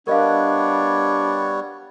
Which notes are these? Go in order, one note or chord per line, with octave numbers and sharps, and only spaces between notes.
G3 B3 D4 A#4 C#5 D#5 F5